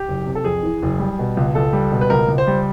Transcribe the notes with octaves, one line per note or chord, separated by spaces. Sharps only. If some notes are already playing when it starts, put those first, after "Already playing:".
Already playing: G4
F#1
C3
A4
F2 G#4
E3
F#1
G3
B2
C#2
C#2 A4
G3
B2
B4
C#2 A#4
C#2
C5
G3